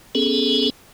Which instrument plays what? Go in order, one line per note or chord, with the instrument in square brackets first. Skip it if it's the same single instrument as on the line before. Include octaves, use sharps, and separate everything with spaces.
[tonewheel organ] B3 C#4 G#4 A4